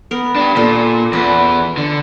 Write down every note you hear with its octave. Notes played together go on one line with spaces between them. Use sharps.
B3 A#4
D4 G4
A#2 F4 A4
E2 B3 C#4 B4
D3